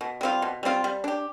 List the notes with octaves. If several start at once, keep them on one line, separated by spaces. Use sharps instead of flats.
B2
G3 C4 F4
B2
G3 C4 F4
G3
D4 G4